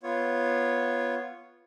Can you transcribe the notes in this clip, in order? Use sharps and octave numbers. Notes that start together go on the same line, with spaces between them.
B3 F4 C#5